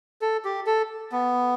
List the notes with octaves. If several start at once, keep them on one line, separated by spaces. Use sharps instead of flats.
A4
G4
A4
B3